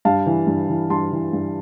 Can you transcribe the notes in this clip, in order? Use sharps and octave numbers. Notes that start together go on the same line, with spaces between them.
G2 F5 A5
E3
G2
E3
G2 A5 C6
E3
G2